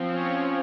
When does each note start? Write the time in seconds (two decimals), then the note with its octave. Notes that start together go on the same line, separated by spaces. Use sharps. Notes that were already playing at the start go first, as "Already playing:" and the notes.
Already playing: F3 C4
0.14 C#4 C#5